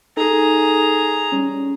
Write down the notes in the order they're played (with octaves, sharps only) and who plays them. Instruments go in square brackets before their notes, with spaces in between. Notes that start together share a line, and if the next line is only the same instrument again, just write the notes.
[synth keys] D#4 A4 [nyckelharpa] G#4 A#5
[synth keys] G3 C#4